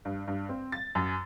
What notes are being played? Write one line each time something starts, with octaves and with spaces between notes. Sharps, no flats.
G2
G2
C4
A6
F#2